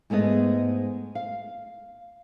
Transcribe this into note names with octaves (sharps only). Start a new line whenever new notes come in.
G#2 G#3 A3 B3 D#5
F5